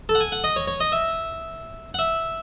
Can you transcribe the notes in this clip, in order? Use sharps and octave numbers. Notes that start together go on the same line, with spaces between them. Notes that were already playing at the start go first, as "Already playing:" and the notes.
A4
F#5
G#5
F#5
D#5
C#5
C#5
D#5
E5
F#5
E5